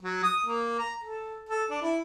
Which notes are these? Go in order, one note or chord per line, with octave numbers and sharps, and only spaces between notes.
F#3
D#6
A#3
A#5
A4
A4
D4
E4